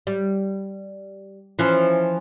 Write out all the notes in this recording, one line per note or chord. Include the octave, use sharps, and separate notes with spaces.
G3
E3 F3 C#4